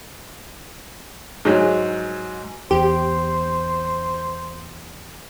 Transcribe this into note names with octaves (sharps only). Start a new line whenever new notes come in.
G#2 F#3 G#4 C#5 G#5
E2 G4 C5